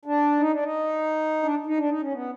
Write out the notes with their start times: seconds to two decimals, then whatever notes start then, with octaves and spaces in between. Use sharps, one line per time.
0.05 D4
0.40 D#4
0.52 D4
0.62 D#4
1.43 D4
1.66 D#4
1.78 D4
1.89 D#4
2.01 C#4
2.13 B3